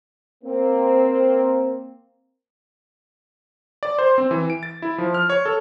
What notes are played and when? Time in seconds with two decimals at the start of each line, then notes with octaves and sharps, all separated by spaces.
0.44 A#3 C4
3.83 D5
3.99 C5
4.18 C4
4.31 E3
4.50 D7
4.63 A6
4.82 E4
4.98 F3
5.14 F6
5.30 C#5
5.45 A4